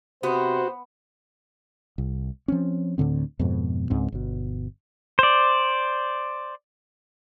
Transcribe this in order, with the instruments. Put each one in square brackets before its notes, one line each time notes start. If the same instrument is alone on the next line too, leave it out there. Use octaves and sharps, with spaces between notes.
[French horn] C3 [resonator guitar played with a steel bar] B3 [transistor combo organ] F#4 [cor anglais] C5
[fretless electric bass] C2
F3 C4 C#4
D2 A2 D3 C4
F2 G#2 B2
C#2 G#2 C4
G1 B2
[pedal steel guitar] C5 D5